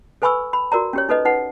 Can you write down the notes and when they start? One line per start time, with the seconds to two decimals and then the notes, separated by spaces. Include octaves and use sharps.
0.22 A4 B4 G#5 B5 C#6 E6
0.53 B5
0.72 F#4 A#4 D5 A#5
0.93 C#4 G4 C#5
1.09 D#4 A4 B4 D#5
1.25 D#4 B4 F#5